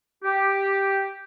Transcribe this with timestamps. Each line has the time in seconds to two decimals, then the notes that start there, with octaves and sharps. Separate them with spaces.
0.24 G4